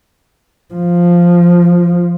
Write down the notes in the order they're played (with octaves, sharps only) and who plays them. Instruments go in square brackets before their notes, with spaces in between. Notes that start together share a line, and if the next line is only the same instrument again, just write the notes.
[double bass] F3